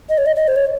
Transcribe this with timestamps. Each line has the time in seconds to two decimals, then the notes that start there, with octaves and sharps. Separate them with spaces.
0.09 D#5
0.18 C#5
0.26 D#5
0.36 D#5
0.48 C5
0.56 C#5